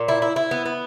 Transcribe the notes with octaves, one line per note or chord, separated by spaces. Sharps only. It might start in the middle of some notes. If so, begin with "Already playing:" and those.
Already playing: A#2
E4
E4
E4
B3
B3